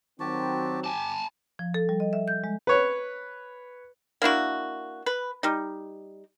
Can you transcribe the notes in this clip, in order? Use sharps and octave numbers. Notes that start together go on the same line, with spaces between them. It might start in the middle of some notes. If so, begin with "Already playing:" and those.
D#3 F#3 C4 F#4 G4 A5
G4 G#5 A5
F3
A4
G3
D#5
E5
G6
G#3
B4 C#5
A#3 D4 E4 F#4
B4
G3 D#4